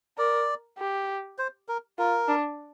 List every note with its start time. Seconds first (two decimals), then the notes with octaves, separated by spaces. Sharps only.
0.18 A#4 D5
0.78 G4
1.38 C5
1.69 A#4
1.98 F4 A#4
2.28 D4